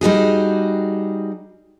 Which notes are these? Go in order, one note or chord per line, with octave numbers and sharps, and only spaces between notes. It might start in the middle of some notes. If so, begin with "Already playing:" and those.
G3 D#4 F#4 G#4